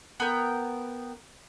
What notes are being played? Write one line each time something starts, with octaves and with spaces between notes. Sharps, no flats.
B3 A#4 G5